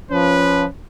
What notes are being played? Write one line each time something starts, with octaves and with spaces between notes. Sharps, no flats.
F3 C#4 B4